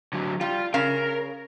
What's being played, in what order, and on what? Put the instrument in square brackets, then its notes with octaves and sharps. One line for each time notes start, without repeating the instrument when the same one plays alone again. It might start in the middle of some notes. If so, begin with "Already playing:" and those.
[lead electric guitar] D3 F#3
[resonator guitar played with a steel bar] G3 [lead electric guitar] F4
[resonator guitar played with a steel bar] C#3 C#4 F5 [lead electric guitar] A#4